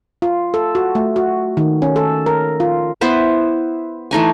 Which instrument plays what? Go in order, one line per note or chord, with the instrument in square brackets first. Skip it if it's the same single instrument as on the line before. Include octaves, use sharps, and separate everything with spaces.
[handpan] F4
A4
F#4
A3
F#4
D#3
C#4
A4
A#4
F4
[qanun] B3 E4 C5 E5
E3 A3 D#4 G#5